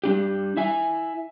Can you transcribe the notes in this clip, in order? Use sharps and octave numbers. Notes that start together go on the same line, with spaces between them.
G3 D4 G4
E4 E5 G#5